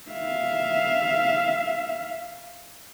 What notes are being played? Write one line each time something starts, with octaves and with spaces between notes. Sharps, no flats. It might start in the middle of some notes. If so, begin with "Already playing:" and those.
E5 F5